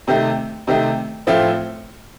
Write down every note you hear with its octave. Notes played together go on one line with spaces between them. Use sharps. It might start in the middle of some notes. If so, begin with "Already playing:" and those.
C3 D#3 A3
C3 D#3 A3
A2 F3 A3 C4 F4